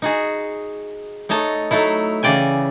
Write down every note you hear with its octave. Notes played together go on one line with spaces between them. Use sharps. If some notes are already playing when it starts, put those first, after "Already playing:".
D#4 F#4 G#4
A3 D#4 C#5 D#5 A5
F#3 A3 D#4 E4
C#3 E3 D5 G5 G#5